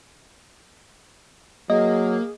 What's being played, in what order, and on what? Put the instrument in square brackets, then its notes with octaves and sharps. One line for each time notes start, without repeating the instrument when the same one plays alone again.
[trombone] F#3 [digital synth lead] A#3 [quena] G#4 [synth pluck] D#5